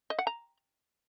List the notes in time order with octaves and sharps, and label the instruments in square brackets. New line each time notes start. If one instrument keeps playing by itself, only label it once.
[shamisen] D#5
F#5
A#5